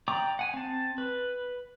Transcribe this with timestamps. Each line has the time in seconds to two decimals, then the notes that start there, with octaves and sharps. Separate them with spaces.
0.08 D5 G5 A#5 D6 D#6
0.39 F#5 G#5
0.54 C4 A5
0.98 B4